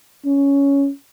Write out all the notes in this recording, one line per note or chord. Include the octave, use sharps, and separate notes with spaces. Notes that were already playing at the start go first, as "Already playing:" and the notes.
C#4